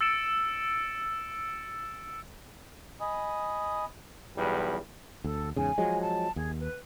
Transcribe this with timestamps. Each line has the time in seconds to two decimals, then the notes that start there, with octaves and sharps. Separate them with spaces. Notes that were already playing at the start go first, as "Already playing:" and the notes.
0.01 E6 A6 C#7 D7 E7
3.01 D#5 G#5 B5 D#6
4.36 B1 E2 G3 B4
5.24 D2 A4
5.56 E2 G#2 C#3 G#5
5.78 F3 F#3 G#3
6.01 A5
6.36 D#2 G#4
6.60 B4